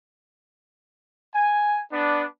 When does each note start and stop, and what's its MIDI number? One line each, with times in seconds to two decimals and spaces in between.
1.34 1.79 80
1.93 2.24 59
1.93 2.24 62